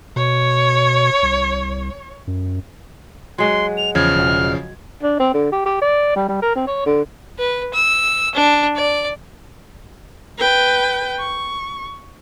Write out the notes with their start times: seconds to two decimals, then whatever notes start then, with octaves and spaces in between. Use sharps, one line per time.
0.16 B2 C#5
1.23 C2
2.27 F#2
3.38 F#3 G#3 F#4 C6
3.77 F7
3.95 E2 C#3 F3 F6 G#6
4.16 E1
5.03 D4
5.19 C4
5.34 D3
5.52 G4
5.65 G4
5.81 D5
6.16 G3
6.29 G3
6.42 A#4
6.55 C4
6.67 C#5
6.86 D3
7.39 B4
7.73 E6
8.35 D4
8.76 D5
10.38 B4 G5
11.18 C#6